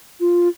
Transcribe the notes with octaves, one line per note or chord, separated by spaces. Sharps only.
F4